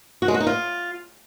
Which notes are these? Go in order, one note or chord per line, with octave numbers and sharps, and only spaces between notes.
F#4
G#3
F#4
D#4
F4